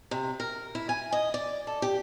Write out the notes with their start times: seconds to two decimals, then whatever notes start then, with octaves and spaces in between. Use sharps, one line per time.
0.11 C3
0.40 A#4
0.75 E4
0.89 G#5
1.12 D#5
1.34 D5
1.67 A4
1.82 G4